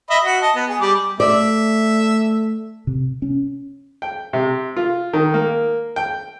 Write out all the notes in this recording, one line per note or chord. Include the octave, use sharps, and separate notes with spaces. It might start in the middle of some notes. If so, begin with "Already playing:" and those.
D#5 E5 B5
F#4
D#5 A5
B3
G#4
G3 D6
A3 D5 E5
C3
C#4
G5
C3
F4
D#3
A#3
G5